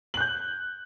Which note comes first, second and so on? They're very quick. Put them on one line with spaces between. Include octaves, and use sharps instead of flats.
F#7 F#6 G6